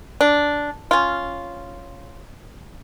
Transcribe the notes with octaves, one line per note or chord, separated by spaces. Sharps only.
D4
C#4 F4